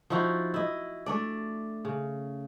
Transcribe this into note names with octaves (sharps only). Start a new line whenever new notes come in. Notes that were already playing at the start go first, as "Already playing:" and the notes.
F3 D#4 E4 F#4
E4 D#5
A3 D4 D5
C#3